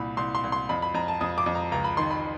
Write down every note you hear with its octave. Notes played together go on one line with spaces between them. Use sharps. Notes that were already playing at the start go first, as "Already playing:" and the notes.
Already playing: C2 A#2 B5
C2 C6
C6
C2
C6
F2 B5
B5
F2 A#5
A5
F2 D#6
D6
F2
A#5
C#2 A#5
B5
D#3 C6
B5